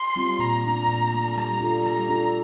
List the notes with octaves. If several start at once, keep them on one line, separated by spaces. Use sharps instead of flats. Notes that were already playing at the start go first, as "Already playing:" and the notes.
Already playing: C6
G3 C4 F4
A#2 A#5
A3 D4
A#2
A3 D4
G3 A#5
D4 F4 A4
G3 A#5
D4 F4 A4